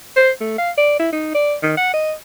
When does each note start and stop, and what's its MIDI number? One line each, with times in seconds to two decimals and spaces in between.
0.16 0.31 72
0.40 0.55 57
0.58 0.71 77
0.77 0.95 74
1.00 1.10 64
1.13 1.30 63
1.34 1.56 74
1.63 1.72 51
1.77 1.93 78
1.94 2.12 75